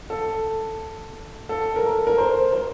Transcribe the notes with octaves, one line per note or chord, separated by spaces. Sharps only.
A4
A4
A#4
A4
A#4
C5
C5